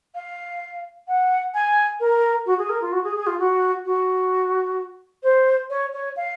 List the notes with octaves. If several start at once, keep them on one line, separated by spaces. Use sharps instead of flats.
F5
F#5
G#5
A#4
F#4
G#4
A#4
F4
F#4
G#4
G#4
F4
F#4
F#4
C5
C#5
C#5
F5